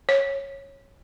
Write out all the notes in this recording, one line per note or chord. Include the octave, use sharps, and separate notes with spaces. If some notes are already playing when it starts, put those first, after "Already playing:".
C#5